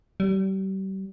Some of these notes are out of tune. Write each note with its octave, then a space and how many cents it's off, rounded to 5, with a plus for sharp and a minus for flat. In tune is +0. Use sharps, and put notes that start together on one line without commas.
G3 -35